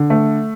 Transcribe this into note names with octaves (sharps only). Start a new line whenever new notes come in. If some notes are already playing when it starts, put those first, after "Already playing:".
Already playing: D3
A3